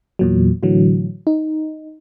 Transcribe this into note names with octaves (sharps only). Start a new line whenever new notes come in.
E2 A#2 F#3
A2 D3 E3 F#3
D#4